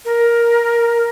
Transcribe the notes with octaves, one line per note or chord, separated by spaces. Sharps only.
A#4